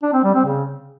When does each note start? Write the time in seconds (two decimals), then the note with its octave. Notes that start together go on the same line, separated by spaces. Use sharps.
0.03 D4
0.13 C4
0.24 G3
0.34 C4
0.45 C#3